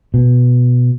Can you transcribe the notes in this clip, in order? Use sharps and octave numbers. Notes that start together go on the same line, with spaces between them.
B2